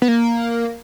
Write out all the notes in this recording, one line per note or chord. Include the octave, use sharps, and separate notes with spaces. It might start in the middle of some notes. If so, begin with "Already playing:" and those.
B3
A#3